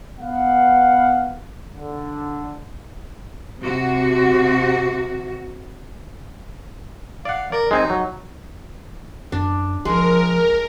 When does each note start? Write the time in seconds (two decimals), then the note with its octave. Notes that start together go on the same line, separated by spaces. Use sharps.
0.19 B3 F5 F#5
1.74 D3
3.61 C3 F#4
7.25 D5 F5 F#5
7.52 A#4 D5
7.71 G#3 C4 D#4 G#5
7.90 F#3
9.32 F#2 D4
9.85 F#1 F3 G#3 A#4